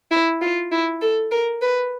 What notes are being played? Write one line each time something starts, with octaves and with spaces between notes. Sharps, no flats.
E4
F4
E4
A4
A#4
B4